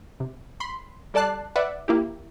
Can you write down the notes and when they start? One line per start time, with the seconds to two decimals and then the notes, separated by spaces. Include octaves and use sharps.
0.20 C3
0.60 B5 C6
1.14 G3 A4 D5 A5 F#6 C7
1.56 B4 D5 E5 F#5
1.88 A#3 E4 G4